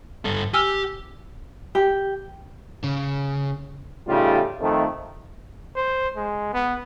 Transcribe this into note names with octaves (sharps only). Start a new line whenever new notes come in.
G2 A4
G4 G#5 E6 F6
G4
C#3
A2 C#3 G3 D#4 F4
F2 D#3 A3
C5
G#3
B3